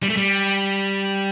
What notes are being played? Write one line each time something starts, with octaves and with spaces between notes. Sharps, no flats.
G3
A3
G3